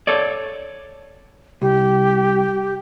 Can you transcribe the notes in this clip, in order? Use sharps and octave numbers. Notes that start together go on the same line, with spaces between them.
A4 C#5 D5
C2 G4